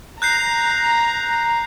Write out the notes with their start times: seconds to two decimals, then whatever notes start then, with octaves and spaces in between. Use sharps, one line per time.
0.22 A#5 F#6 G6 C7